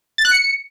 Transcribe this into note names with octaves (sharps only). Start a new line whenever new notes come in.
A6
F#6
C#7